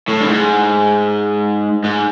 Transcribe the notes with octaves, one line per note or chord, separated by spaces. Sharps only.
A2
G2
G#2
G#2